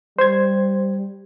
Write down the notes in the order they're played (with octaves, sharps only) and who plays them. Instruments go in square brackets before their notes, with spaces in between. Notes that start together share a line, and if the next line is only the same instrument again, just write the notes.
[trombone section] G3 [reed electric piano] C5 G#6